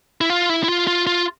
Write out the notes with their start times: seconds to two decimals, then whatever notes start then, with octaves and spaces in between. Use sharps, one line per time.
0.21 E4
0.30 F4
0.49 E4
0.64 E4
0.68 F4
0.87 F4
1.07 F4